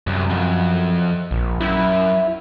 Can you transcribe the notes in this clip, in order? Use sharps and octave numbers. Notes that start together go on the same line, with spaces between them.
C2 F#2
F2
A#1
F#2 E4